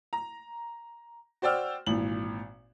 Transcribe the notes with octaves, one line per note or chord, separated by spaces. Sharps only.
A#5
F#4 C5 D5 G5 E6 F6
G#1 A#2 E3 F#7